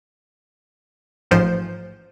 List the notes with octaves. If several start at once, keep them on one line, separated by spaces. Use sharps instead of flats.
A1 G#2 F3 C5 G6